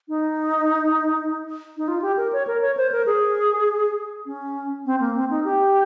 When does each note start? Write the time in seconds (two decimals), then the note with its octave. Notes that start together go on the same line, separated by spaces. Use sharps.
0.09 D#4
1.77 D#4
1.88 F4
2.02 G4
2.17 A#4
2.33 C#5
2.47 A#4
2.61 C#5
2.77 C5
2.92 A#4
3.06 G#4
4.26 C#4
4.86 C4
5.00 A#3
5.15 C4
5.30 D#4
5.45 G4